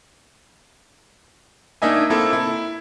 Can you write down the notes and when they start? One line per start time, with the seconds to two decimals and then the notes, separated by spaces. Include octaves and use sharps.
1.82 A#3 D4 D#4 D#5 E5 G#5
2.10 A#3 C4 E4 A4
2.33 E4